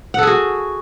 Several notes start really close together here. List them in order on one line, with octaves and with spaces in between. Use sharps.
F#5 A4 G#4 F#4